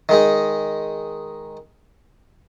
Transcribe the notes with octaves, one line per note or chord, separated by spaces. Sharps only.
D#3 G#3 D#4